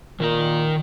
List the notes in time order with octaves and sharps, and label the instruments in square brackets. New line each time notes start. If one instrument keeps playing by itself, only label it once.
[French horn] A#2 [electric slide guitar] D#3 A#4 A#5